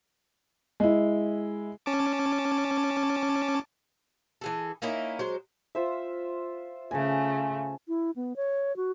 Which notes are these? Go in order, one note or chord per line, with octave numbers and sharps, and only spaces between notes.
G#3 E4
C#4 A5 D6
E3 G#4 A4
A#3 C#4 D#4 E4
F#3 G#3 C5
F4 C5 E5
C#3 A3 G#5 A5
E4
B3
C#5
F#4